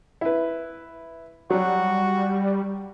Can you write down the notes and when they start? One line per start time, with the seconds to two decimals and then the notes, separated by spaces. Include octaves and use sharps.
0.21 E4 B4
1.50 F#3 G3 F#4